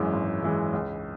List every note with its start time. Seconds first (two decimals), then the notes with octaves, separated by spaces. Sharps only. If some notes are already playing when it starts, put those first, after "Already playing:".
Already playing: G#1 F#2 E3 G#3
0.13 G#1
0.43 F#2 E3 G#3
0.73 C#2